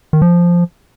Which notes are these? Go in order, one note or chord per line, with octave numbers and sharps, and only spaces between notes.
D#3
F3